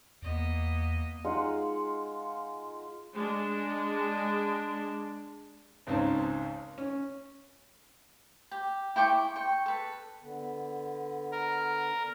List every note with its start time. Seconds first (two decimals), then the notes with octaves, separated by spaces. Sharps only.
0.22 E2 A#3 B3 D#5
1.25 G#3 D#4 F4 F#5
3.14 G#3 D4
5.87 G#1 C#2 C4 C#4 D#4 A5
6.78 C#4
8.51 G4
8.96 E4 G5 C#6 D6
9.36 G5 C#6
9.66 A4 B4
10.23 D3 B3
11.32 A#4